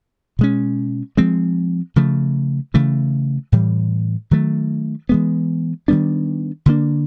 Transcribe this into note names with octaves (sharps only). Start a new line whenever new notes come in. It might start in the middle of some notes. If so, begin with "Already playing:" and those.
B2 G#3 C#4
F3 G#3 C4
C#3 F3 A3
C#3 E3 A3
A2 E3 G3
D#3 F#3 A3
E3 G#3 B3
D#3 G3 B3 D4
D3 F3 A#3 D4